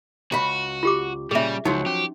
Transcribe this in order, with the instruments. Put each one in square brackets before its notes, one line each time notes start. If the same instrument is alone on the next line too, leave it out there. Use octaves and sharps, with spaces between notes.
[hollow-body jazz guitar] C#2 B5 [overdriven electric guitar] F#4
[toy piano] F4 G4 D6
[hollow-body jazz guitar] A#2 C#3 [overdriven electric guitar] G3 [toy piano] G#4 E5
[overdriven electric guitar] C#2 [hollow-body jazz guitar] F3 F#3 [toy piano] D#4 F#4
[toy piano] C#4 [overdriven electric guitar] G4